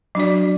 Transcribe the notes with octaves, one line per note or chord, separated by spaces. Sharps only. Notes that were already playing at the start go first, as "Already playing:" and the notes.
F#3 D4 F#4 D5